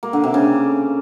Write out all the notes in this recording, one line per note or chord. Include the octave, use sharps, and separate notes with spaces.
A#3
D3
C3
C#3